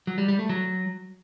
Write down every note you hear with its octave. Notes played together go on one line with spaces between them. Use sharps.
F#3
G3
G3
A3
F#3